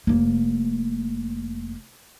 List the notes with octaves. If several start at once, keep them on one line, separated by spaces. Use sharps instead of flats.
F1 A#3